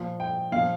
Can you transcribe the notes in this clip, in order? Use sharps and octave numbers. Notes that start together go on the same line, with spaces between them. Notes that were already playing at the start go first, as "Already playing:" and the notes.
Already playing: A#2 F3
G5
A#2 F3 F5